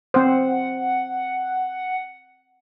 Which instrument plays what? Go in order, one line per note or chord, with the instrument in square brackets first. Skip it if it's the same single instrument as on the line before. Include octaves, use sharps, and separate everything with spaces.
[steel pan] C4 C5 [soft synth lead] F#5